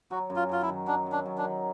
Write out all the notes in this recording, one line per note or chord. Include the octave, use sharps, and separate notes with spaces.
F#3 F#4
F#2
F4
F#2 F4
E4
D#3
F#3 D4
F#2
D4
F#2
D4
D#3